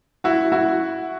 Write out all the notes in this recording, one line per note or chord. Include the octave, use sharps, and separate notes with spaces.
E4 F#4
E4 F#4